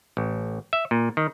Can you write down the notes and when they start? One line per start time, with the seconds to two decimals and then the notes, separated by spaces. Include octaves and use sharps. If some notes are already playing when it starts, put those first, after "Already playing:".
0.17 A1
0.73 E5
0.91 A#2
1.17 D#3